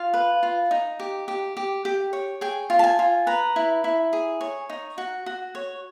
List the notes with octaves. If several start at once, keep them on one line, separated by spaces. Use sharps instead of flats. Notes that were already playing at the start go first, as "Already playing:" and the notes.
Already playing: F4 F5
B4
F4
D#4
G4
G4
G4
G4
C#5
G#4 G5
F4
A5
G#5
F4
B4 A#5
E4
E4
G#4
C#5
D#4
F#4
F#4
C#5